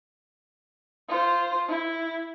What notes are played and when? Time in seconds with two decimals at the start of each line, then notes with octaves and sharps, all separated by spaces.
1.09 F4 C5
1.68 E4